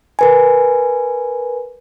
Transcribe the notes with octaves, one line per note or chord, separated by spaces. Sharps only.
A#4 B4 G#5